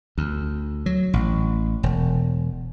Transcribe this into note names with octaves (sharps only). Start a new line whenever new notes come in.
D2
F#3
A1
E1